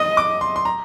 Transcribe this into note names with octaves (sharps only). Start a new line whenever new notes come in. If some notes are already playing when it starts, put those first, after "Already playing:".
Already playing: D#5 D#6
D6
C6
C6
A#5